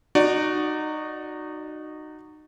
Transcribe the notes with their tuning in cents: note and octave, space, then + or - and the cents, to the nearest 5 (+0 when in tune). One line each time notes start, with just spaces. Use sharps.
D#4 -25 F#4 +0 D5 +0